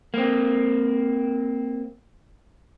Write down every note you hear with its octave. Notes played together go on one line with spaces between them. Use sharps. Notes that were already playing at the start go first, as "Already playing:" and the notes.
A#3 C4